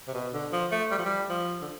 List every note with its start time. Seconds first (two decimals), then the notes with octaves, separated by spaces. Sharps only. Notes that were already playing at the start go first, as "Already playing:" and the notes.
0.08 C3
0.14 B2
0.33 D3
0.52 F3
0.71 A3
0.91 G3
0.98 F3
1.05 G3
1.29 F3
1.61 D3